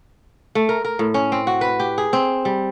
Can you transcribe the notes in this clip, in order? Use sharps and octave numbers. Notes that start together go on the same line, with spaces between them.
A3
A#4
A#4
A2
C#4
C4
F#4
B4
G4
G#4
C4
G3